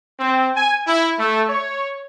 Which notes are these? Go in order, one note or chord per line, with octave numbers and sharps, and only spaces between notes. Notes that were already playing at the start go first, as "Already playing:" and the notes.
C4
G#5
E4
A3
C#5